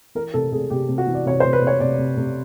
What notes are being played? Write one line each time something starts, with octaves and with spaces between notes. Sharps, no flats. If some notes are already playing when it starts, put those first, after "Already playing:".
E3 A#4
C3 A4
C3 G#4
C3 G4
C3
F#4
E3
D5
C3 C#5
C3 C5
B4
C3
C#5
C3 D5
C3
C3